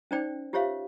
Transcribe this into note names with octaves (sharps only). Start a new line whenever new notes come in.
C#4 D#4 C5 D5 G5
F4 G4 C5 C#5 E5 F5